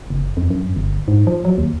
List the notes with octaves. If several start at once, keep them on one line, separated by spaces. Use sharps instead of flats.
F#1
F2
F#2
G1
G#2
F3
F#3
D#2